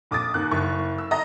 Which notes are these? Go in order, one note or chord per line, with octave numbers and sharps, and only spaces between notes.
A#1 D6 D#6 A6
D#2 F#6
F#1 C#6
E6
D#5 A#5 A#6